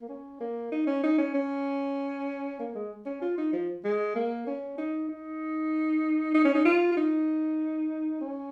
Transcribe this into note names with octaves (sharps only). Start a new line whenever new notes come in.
A#3
C#4
A#3
D#4
C#4
D#4
C#4
C#4
A#3
G#3
C#4
F4
D#4
F3
G#3
A#3
C#4
D#4
D#4
D#4
C#4
D#4
F4
F4
D#4
C#4